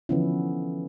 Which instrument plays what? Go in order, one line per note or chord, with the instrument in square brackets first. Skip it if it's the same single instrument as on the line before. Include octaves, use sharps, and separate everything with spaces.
[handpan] D3 E3 F3 B3 C#4 E4